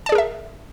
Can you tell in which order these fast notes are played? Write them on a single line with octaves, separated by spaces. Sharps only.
A5 D5 G#4 A#4 E5